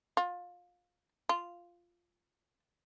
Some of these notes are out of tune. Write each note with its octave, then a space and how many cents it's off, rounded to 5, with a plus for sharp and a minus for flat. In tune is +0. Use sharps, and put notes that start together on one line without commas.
F4 +25
F4 -5